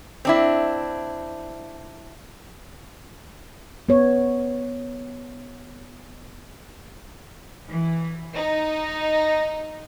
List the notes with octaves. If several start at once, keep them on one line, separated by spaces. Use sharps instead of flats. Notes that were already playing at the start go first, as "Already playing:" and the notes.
C4 D4 E4
B3 C#5
E3
D#4